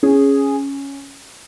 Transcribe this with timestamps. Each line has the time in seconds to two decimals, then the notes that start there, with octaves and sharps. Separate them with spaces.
0.03 C#4 G#4